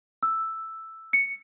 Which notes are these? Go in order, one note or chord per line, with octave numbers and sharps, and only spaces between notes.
E6
C#7